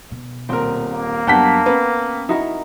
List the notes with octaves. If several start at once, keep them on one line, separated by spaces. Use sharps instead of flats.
B2
D#1 C4 A#4
A#3
G2 F#3 B3 F#5 G5 A5 G6 B6
B3 C#4
D#4 E4 F#4 A#4